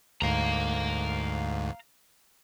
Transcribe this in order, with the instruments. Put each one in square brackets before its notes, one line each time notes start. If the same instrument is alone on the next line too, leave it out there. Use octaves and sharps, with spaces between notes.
[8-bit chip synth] D2 G#2 [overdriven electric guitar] F5 A#5